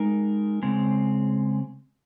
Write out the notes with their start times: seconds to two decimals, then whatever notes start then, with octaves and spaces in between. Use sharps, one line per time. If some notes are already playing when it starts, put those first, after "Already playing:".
Already playing: G#3 D#4 A#4
0.62 C#3 G#3 C4